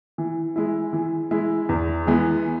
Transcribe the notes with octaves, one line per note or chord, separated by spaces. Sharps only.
E3
G#3 E4
E3
G#3 E4
E2
E3 G#3 B3